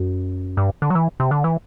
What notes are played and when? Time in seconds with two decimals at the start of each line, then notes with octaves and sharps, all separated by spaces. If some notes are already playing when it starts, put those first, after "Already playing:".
Already playing: F#2
0.57 G2
0.82 D3
0.90 F#3
0.95 E3
1.20 C3
1.31 D3
1.44 E3